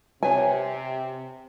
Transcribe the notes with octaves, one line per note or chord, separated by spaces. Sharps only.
C3 B4 C#5 G#5 A5